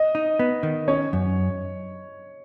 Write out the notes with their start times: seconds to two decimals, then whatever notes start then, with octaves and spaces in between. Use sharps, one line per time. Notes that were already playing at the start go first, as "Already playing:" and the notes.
Already playing: D#5
0.15 D#4
0.39 B3
0.63 D#3
0.88 C#4 C#5
1.13 F#2